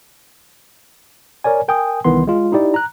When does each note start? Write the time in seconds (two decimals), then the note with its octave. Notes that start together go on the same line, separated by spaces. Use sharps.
1.44 A#4 C#5 D5 G#5
1.68 A#4 G5 G#5 D#6
2.04 C2 D#3 E3 B3 C6
2.27 G#3 F4
2.52 D#4 E4 G4 D5
2.74 A#5 F#6